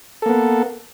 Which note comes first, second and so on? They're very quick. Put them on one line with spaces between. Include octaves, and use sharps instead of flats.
A4 A#3 B3